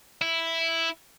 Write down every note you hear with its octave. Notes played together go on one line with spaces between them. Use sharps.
E4